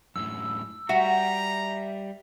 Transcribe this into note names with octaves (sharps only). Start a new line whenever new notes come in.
F#2 A2 E6
G3 F#4 E5 A#5